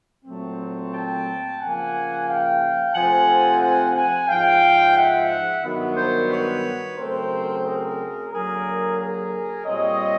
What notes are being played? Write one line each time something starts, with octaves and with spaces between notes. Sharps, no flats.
A#2 F#3 A3 C4
G5 A5
C#3 F3 A#3 F#5 G#5
F5 G5
C3 F3 A3 C4 F#5 G#5
F#5 G#5
F#5 G#5
G#2 F3 G#3 F5 G5
E5 F#5
G2 D#3 F#3 B3
A#4 C5
B4 C#5
C#3 F#3 A3 C4 A#4 C5
G#4 A#4
D3 F#3 A#3 G#4 A#4
G#4 A#4
A#2 G3 C4 C#5 D#5